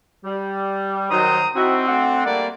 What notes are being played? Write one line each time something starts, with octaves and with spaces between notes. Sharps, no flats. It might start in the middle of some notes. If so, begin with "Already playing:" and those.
G3
D#3 F#3 C5 A#5 D#6
C4 D#4 E4 F#4
A3 D4 F#5
G3 A#3 D5